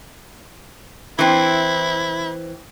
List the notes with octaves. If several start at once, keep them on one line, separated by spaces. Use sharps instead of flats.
E3 C4 E4